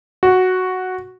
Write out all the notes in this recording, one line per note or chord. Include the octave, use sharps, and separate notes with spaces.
F#4